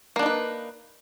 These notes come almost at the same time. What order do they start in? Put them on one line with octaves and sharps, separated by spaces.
A#3 D4 D#4 B4